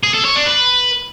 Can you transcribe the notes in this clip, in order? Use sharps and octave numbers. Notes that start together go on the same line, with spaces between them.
G#4
A4
C#5
D4
B4